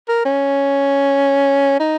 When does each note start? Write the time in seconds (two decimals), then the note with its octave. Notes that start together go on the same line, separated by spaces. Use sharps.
0.09 A#4
0.25 C#4
1.80 D#4